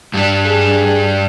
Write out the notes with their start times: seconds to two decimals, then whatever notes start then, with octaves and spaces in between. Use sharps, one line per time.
0.14 G2 G3
0.46 G#4